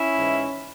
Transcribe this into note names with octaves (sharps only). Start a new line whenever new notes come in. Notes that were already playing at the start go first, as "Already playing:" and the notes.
Already playing: C#4 E4
G#2 E3